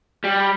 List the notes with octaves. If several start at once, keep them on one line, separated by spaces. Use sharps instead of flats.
G3